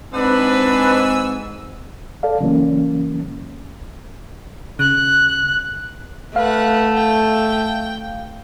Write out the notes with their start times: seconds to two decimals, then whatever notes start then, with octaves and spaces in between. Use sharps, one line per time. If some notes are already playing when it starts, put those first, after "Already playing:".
0.14 G#2 C4 D4 B4 F#5 G#5 E6
2.23 A4 D5 F5
2.41 C#3 E3 F#3 A#3 C#4
4.79 C#3 F#6
6.36 A3 B4 F5 F#5
6.97 G5